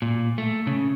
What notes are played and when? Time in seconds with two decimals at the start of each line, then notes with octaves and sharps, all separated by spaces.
0.02 A#2
0.38 A3
0.67 C#3